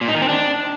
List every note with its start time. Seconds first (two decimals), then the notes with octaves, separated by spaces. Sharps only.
0.01 A#2
0.08 D#4
0.15 D#3
0.22 C4
0.29 D4